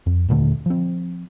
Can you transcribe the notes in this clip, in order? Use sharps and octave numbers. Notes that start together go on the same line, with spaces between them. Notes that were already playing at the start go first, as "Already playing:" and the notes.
F2
D#2 A#2 D3 A3
F3 C4